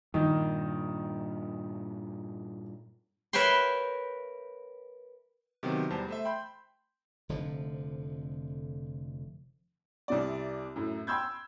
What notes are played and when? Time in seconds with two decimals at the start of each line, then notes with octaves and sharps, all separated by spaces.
0.14 G2 A#2 D#3
3.33 A#4 B4 C#5 E5 G5 C6
5.63 C3 D#3 F#3 B3 C4
5.90 E2 G3 C5 A5
6.08 A3 C5 E5
6.25 G5 B5 C6 G6
7.29 F1 D3 F3
10.08 C2 C3 D5
10.76 F#2 A2
11.07 G5 B5 C6 E6 G6 G#6